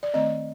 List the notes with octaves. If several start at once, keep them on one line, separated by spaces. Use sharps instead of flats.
D5
D#3 A3 C4 D#5